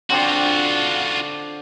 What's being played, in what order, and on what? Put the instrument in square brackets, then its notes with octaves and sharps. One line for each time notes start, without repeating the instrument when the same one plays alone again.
[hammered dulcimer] D3 C4 D4 [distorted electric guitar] F4 F#4